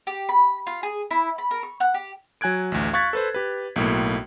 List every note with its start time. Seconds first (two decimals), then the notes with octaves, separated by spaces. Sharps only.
0.07 G4
0.29 B5
0.67 F4
0.83 G#4
1.11 E4
1.38 B5
1.51 A#4
1.63 C#6
1.80 F#5
1.94 G4
2.41 F#3 G#5 F#6 G#6 D7
2.72 A1 D2
2.93 F5 C#6 F#6 G#6 A6 B6
3.13 A4 B4 C5
3.35 G4 B4
3.76 B1 A2 A#3